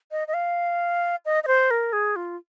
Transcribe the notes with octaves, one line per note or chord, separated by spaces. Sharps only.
D#5
D#5
F5
D#5
D#5
C5
A#4
G#4
F4